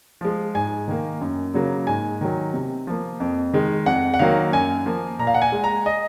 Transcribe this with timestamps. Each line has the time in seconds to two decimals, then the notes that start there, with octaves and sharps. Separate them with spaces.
0.21 F3 G#3
0.55 G#2 G#5
0.88 D#3 A#3
1.21 F#2
1.54 C#3 F#3 A#3
1.87 G#2 G#5
2.21 D#3 F#3
2.54 C3
2.87 F3 A#3
3.20 F2
3.53 D#3 G#3
3.86 F2 F#5
4.14 F#5
4.19 D#3 F#3 A#3 F5
4.52 F#2 G#5
4.86 F3 A#3
5.19 A#2 A#5
5.27 F5
5.34 F#5
5.42 G#5
5.52 G#3
5.64 A#5
5.86 D#5